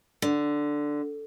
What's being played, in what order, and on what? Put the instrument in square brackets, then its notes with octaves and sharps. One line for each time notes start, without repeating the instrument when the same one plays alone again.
[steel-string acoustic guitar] D3